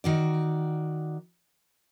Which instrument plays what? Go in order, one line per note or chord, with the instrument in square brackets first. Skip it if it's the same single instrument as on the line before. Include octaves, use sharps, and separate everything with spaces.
[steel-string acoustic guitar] D#3 F#4 D5